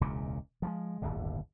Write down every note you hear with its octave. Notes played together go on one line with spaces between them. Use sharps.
E1 C#2 A#2 C#3
F3 F#3 G#3
D1 G1 D#2 D3